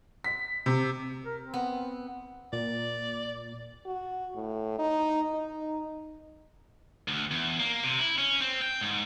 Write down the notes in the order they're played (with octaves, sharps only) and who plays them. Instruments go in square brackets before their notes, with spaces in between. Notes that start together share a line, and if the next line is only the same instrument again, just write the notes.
[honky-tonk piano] B6
C3
[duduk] A#4
C4
[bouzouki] B3
[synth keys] A#2 [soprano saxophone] D5
[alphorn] F#4
A2
D#4
D#4
[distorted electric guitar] D2
E2
A#3
C3
E4
C#4
C4
G5
G#2